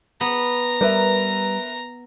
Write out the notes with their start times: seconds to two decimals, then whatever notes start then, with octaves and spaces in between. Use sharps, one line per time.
0.21 B3 A#5
0.81 G3 A#4 B4 E5